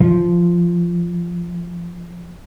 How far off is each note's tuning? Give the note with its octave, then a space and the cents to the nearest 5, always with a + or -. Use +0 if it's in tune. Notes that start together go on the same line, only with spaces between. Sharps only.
F3 -10